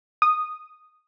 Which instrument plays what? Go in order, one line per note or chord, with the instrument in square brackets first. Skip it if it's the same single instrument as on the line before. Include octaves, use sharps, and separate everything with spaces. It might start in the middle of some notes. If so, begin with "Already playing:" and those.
[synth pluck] D#6